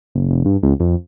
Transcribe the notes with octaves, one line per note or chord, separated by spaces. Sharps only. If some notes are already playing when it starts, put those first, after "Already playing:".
F#1
F1
G2
C#2
F2